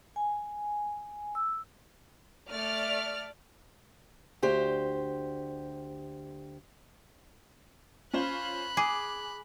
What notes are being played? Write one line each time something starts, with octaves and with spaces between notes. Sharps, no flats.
G#5
E6
A3 D5 F6
D2 G4 C5
C#4 F4 C5 B5 F#6
G#4 D6